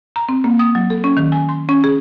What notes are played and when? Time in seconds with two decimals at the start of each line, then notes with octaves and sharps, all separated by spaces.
0.16 A#5
0.29 C4
0.44 A#3
0.59 D#6
0.75 F#3
0.90 A4
1.04 C#4
1.17 D#3
1.32 G#5
1.49 C6
1.69 C#4
1.84 G#4